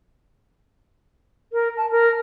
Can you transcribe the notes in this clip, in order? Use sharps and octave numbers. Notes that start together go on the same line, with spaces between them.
A#4
A5
A#4